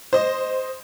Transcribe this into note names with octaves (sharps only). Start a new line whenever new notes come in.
C5 D#5